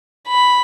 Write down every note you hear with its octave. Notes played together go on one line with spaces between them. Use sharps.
B5